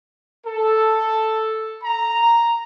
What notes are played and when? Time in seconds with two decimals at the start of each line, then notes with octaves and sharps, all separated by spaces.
0.47 A4
1.83 A#5